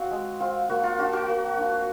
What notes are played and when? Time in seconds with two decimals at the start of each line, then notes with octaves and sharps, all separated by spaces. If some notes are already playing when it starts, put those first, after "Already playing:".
Already playing: C4 F4 F#4
0.11 G#3
0.40 C4 F4
0.69 A#3 F#4
0.83 F4
0.99 D4 F4 F#4
1.13 F#4
1.28 A#3
1.57 D4 F4